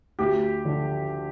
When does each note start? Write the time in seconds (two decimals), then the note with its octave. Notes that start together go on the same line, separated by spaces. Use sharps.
0.19 D2 G4
0.65 D3 F3